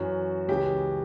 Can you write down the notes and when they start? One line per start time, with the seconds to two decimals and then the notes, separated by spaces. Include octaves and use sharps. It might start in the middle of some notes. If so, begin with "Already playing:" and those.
Already playing: F#2 E3 F#4
0.48 C#2 C#3 E3 G4